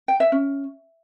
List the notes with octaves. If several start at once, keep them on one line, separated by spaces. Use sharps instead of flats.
G5
E5
C#4